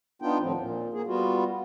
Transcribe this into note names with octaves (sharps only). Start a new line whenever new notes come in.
B3 D4 D#4 F4 G5
D#2 A2 F3 C4
A#2
A#3 G#4
G3 B3 F4 F#4